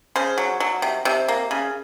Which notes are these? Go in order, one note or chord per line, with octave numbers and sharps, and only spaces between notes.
C#3 C5
F#3
F#3
C3
C3
A#3
C#3